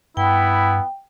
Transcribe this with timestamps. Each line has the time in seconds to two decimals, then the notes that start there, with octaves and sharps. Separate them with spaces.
0.17 G2 B3 E4 G5